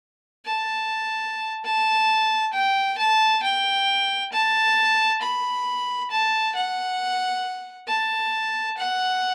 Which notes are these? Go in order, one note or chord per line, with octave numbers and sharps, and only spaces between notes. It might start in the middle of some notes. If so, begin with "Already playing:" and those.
A5
A5
G5
A5
G5
A5
B5
A5
F#5
A5
F#5